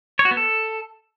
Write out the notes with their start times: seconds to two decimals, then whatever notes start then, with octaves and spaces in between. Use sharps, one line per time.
0.19 C#5
0.25 F#4
0.31 B3
0.37 A4